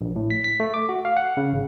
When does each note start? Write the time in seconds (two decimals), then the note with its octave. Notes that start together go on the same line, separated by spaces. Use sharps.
0.01 A#1
0.16 A2
0.30 B6
0.44 B6
0.60 A3
0.74 D6
0.89 F#4
1.05 F5
1.17 F#5
1.37 C#3
1.53 G#1